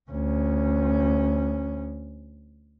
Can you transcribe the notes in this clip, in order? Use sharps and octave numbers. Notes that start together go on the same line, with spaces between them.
D2 C#4